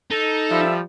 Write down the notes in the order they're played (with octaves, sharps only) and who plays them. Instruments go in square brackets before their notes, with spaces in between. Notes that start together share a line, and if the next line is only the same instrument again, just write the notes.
[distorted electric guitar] D#4 [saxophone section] A4
[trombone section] F3 G3 [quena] E5